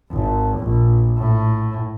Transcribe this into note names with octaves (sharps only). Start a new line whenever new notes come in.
G#1
A#1
A2